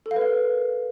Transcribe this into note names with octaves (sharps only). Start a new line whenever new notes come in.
A4
F5
B4
A#4